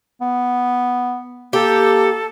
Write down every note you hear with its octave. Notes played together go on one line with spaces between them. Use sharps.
B3
A#3 G4 A4